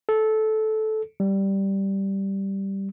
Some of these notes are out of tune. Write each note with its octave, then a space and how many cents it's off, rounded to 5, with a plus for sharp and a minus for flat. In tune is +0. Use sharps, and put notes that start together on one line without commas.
A4 -15
G3 -5